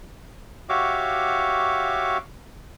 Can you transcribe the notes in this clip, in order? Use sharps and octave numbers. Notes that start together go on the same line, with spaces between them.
F#4 G4 C#5 E5 F5 D6